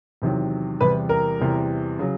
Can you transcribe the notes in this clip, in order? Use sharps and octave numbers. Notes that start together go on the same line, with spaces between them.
E2 C3 D#3 F#3
E2 C3 E3 G3 B4
A#4
E2 C3 E3 G3
C#3 F#3